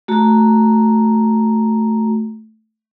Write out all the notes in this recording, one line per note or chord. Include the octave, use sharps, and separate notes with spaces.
A3 F#4 A#5